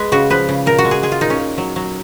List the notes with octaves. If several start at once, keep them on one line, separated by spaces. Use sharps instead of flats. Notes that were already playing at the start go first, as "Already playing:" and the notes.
Already playing: G#3 G#4 B4
C#3 F#4
F3 B4
C#3
A#2 A#4
F#4
G#3
G#4
G#3 G#4
F4
A#2 D#4
C#4
A#2
F#3
F#3